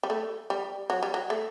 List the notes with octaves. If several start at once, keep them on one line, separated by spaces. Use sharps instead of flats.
G3
A3
G3
F#3
G3
F#3
A3